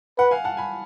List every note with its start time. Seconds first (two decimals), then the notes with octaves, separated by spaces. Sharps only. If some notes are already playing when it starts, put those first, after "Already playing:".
0.18 B4 F#5
0.31 F5 G#5
0.44 F#5 A5
0.57 G#5 B5